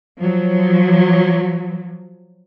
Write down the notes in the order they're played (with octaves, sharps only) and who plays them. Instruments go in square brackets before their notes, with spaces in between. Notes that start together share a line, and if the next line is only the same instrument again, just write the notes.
[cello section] F3 F#3